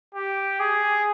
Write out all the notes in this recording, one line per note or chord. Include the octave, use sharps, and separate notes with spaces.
G4
G#4